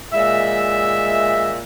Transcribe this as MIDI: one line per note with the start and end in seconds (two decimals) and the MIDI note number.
0.14 1.61 46
0.14 1.61 56
0.14 1.61 76